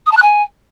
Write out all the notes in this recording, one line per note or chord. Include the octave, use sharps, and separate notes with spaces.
D#6
A5
F#6
G#5